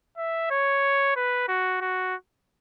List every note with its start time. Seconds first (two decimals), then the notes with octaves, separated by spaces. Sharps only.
0.18 E5
0.51 C#5
1.16 B4
1.48 F#4
1.81 F#4